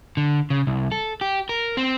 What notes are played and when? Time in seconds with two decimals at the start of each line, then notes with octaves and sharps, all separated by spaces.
0.17 D3
0.50 C#3
0.67 C2
0.92 A4
1.21 G4
1.49 A#4
1.77 C4